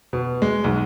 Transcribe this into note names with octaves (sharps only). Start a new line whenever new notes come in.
B2
G#3
B1